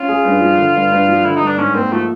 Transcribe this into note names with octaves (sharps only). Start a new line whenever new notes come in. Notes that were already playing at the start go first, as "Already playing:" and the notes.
Already playing: C#4 F4
G#4
G2
F3
D3
G2
G2
F3
D3 E4
G2 D#4
D4
G#2 C#4
A#3 C4
F3 A3